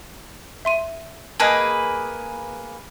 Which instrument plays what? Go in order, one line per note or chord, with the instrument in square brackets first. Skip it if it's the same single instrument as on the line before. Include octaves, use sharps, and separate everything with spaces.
[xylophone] E5 C6 D#7
[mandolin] A#3 G#4 B4 [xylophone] D#5 A5